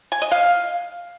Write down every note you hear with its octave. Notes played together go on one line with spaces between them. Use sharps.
G#5
D#5
F5